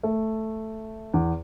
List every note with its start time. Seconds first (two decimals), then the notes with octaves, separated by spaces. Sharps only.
0.03 A3
1.14 E2